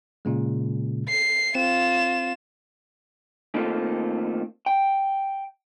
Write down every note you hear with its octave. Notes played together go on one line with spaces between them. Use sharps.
A#2 C#3 G#3
C7
C4 F4 E7
D#3 A3 A#3 C4 F4 A4
G5